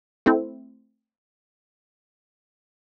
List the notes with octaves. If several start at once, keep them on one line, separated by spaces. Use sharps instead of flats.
A3 C4 E4